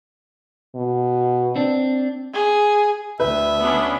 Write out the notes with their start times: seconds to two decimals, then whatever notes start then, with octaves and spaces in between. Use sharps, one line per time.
0.76 B2
1.56 C4 D4
2.34 G#4
3.20 D2 B4 E5
3.63 B3 C#4 D4